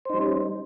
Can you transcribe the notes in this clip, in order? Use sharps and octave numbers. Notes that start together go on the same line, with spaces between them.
G3 C#4 D#4 C5